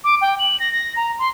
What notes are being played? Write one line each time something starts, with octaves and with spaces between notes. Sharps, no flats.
D6
G5
F#7
A#6
A#6
A#5
C6